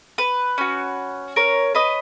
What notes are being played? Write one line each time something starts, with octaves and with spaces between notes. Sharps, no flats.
B4
C#4 F#4
A#4 C#5
B4 D#5